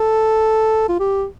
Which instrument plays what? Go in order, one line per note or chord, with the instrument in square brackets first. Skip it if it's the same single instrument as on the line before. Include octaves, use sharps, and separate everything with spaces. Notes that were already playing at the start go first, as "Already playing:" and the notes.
Already playing: [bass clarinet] A4
F4
G4